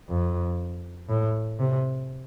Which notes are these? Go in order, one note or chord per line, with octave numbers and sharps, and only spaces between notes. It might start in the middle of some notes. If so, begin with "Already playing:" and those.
F2
A2
C3